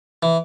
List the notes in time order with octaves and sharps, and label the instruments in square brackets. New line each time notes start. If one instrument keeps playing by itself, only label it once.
[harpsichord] E3